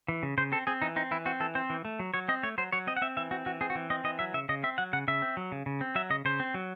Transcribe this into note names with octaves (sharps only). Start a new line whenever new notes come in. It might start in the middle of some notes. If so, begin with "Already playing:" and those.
E3
C#3
C#3 C5
C4 A4
C4 G#4
E3 D#4
C4 D#4
E3 E4
C4 F#4
E3 A4
C4 C5
E3
A3
F#3
F#3 C#5
C4 D#5
A3 C#5
F#3 C5
F#3 C#5
C4 D#5
F#5
C4 E5
E3 E5
C4 F#4
E3 F#4
C4 G#4
F#4
E3
C4 D#5
E3 D#5
F#3 E5
C#3 E5
C#3 D#5
C4 E5
F#3 F#5
C#3 F#5
C#3 E5
C4
F#3
C#3
C#3
C4
F#3 E5
C#3 D#5
C#3 C5
C4
F#3